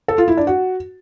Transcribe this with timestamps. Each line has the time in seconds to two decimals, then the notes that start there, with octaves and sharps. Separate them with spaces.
0.08 A4
0.18 F4
0.28 E4
0.37 D4
0.47 F#4